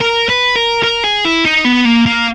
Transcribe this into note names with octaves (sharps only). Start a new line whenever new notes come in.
A#4
B4
A#4
A#4
G#4
E4
D#4
B3
A#3
A#3